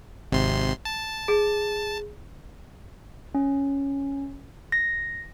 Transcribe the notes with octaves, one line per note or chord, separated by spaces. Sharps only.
G#1 C3 C6
A5
G#4
C#4
A#6